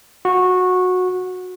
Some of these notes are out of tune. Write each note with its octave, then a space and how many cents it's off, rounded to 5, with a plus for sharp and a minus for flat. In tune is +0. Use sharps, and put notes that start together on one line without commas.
F#4 -15